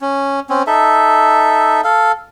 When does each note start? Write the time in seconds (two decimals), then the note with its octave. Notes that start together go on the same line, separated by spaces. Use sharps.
0.01 C#4
0.49 C4 C#4
0.67 D#4 A4 E5
1.84 A4 F5